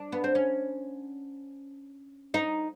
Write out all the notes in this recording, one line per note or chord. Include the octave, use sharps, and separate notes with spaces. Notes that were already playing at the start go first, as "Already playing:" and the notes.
Already playing: D4
B3
C4
C#4
D#4